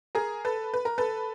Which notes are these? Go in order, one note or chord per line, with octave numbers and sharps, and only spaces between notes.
G#4 A#4
A4 B4
B4
A#4
A4 B4